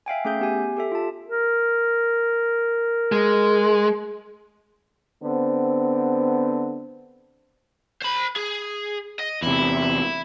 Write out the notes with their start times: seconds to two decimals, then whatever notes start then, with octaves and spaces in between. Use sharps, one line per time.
0.06 E5 F5 G5 G#5
0.25 A3 C#4 G#4 E5 G6
0.40 B3 G4 G#5
0.77 G4 A4 E5
0.92 F4 A5
1.28 A#4
3.12 G#3
5.23 D3 B3 C4
8.02 C5 B5
8.36 G#4
9.19 D#5
9.42 E2 C3 E4